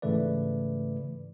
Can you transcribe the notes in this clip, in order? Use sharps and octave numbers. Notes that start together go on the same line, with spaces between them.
G#2 C#3 E3 A3 B4 D5